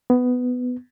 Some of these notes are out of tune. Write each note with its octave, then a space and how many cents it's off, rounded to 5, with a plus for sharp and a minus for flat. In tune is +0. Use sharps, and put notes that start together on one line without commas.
B3 +10